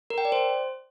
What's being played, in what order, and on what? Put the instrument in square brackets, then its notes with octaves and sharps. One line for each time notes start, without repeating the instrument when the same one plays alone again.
[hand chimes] A#4
G5
D5
C5